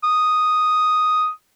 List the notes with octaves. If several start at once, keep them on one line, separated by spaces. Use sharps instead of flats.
D#6